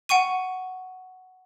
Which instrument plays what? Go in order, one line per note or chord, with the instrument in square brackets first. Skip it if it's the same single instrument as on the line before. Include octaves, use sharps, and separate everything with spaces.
[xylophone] F#5 G5 C#6 D#7